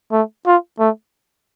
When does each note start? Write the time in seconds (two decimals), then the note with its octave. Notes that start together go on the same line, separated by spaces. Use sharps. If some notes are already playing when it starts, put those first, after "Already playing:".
0.12 A3
0.46 F4
0.79 A3